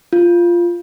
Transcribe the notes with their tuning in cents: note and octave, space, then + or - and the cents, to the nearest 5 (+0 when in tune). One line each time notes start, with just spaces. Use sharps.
F4 -10